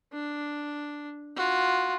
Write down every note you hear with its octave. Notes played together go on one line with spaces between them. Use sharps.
D4
F4 F#4